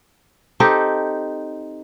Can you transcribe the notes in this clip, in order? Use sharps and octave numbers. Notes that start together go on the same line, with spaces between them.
C4 D#4 G4 A4